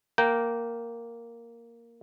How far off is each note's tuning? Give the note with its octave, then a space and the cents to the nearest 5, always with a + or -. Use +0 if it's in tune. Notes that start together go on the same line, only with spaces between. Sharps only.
A#3 +0 G5 -15 A#5 +0